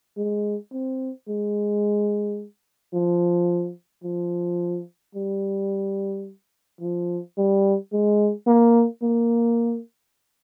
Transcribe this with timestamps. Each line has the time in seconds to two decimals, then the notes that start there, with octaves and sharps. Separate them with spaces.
0.17 G#3
0.72 C4
1.28 G#3
2.94 F3
4.04 F3
5.15 G3
6.81 F3
7.38 G3
7.93 G#3
8.47 A#3
9.02 A#3